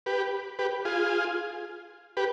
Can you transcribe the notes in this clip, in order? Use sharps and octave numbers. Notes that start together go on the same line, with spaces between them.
G4 B4
G4 B4
F4 G#4
G4 B4